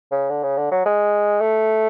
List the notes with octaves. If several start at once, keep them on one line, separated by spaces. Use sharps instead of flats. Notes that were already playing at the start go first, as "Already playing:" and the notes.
C#3
D3
C#3
D3
F#3
G#3
A3